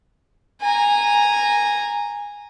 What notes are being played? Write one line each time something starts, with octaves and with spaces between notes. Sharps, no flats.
G#5 A#5